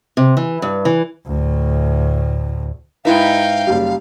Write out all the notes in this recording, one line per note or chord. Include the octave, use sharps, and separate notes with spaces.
C3
E3
G2
E3
D2 A2
G#2 D#4 E4 B4 E5 F5 G5
F#1 G3